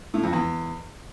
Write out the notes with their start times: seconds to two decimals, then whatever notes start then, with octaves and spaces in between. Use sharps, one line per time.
0.14 A2
0.23 F2
0.33 E2